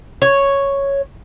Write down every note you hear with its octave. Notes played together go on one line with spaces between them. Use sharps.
C#5